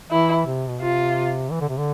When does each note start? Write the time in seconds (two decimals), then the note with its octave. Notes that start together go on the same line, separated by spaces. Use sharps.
0.10 E3 E4
0.45 C3
0.68 B2
0.81 C3 F4
1.51 E3
1.61 D3
1.69 C3
1.78 D3